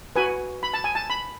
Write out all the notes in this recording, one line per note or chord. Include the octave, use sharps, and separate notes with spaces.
F#4 B4 G#5
B5
A5
G#5
A5
B5